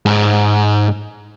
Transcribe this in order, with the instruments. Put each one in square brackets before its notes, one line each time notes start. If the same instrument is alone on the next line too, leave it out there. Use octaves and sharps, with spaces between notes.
[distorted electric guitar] G#2